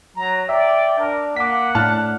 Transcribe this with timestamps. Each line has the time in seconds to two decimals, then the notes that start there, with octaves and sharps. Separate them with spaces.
0.16 F#3 A#5
0.49 D5 E5 G5
0.99 D4 A#4
1.36 A#3 F#5 D6 B6
1.75 A2 D4 A5 F6 F#6